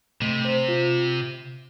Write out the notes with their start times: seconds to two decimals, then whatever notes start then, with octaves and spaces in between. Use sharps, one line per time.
0.21 C3 A3
0.45 C5
0.68 F4